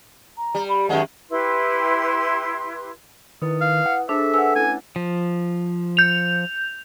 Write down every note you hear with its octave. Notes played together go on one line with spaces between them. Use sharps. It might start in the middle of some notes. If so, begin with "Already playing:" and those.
A#5
G3
B5
F#2 D#3 G#3 F#5
E4 G4 B4 C6
D#3 E4 B4 D#6
F5
F#5
D4 G#4 A4 C5 E5
B4 F#5 G#5 E6
A3 C#4 E4 G#5
F3
G6 F7